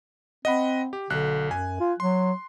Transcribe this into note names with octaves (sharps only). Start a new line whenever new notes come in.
C4 D#5 F#5 B5
G4
B1 D3 F#6
F#2 G#5
F4
F#3 C6